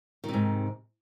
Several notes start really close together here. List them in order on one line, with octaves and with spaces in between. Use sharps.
D#3 C3 G#2